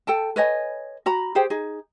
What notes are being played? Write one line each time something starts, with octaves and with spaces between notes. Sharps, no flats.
A4 G5 A5
B4 C#5 D#5 G#5
F#4 A#5 B5
G4 G#4 C5 G5
D#4 G#4